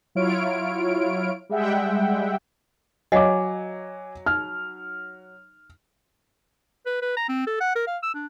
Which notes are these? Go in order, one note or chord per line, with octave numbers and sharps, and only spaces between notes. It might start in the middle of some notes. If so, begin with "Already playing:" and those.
F#3 E4 F4 C#5 F6 D7
G3 G#3 E5 F#5 G5
F#3 D#5 F5 F#5 G#5 D6
D#4 F6
B4
B4
A#5
C4
A4
F#5
A#4
F5
E6
D4